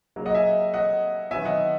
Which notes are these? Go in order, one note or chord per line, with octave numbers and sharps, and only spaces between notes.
C#3 F#3 A#3
D#5 F#5
E5 G#5
D#5 F#5
D#3 F#3 B3 E5 G#5
D#5 F#5